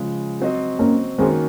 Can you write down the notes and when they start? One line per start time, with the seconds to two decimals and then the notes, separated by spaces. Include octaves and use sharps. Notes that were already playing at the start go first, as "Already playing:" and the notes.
Already playing: C#3 F3 G#3
0.40 F#3 C4 F#4 C5 D#5
0.79 A#3 C#4
1.18 D#3 G#3 A#3 C4 C#4 F#4